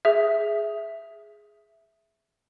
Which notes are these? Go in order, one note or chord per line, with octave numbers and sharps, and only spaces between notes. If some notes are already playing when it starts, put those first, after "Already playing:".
G#4 E5